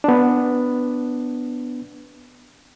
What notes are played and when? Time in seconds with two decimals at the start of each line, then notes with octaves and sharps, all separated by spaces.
0.04 B3 D4